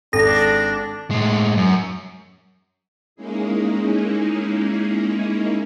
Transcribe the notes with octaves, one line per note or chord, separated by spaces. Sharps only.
G#1 D4 A4 A#6
A2 G#3
F#2
G#3 A#3 C#4 D#4 E4 G#4